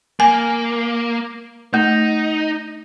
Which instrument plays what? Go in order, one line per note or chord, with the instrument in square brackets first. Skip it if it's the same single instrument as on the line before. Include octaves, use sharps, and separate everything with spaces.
[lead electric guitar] A#3 [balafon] G#5
[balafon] A3 [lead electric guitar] D#4